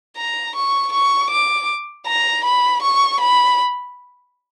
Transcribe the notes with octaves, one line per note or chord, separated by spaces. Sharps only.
A#5
C#6
C#6
D6
A#5
B5
C#6
B5